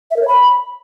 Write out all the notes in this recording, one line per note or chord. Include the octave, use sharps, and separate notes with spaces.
E5
A#4
C#5
B5